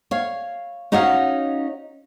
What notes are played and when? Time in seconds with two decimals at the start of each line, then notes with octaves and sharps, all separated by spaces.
0.11 C#5 F5
0.92 C#4 D#4 F#4 C#5 D#5 F5